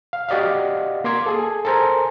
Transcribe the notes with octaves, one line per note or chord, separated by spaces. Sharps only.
F5
F#4 G4 D5 D#5 F5
A#3 C6 D6 G#6
G#4 A4
A4 A#4 C5 G#5 A#5